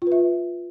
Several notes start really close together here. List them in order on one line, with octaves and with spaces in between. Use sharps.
F4 B4 E5